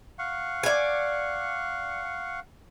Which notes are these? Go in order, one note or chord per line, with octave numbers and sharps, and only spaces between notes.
F5 F#5 C#6
D5 G#5